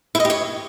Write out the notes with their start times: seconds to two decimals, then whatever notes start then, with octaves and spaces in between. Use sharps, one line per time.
0.15 E4
0.20 D#5
0.25 G4
0.30 C#5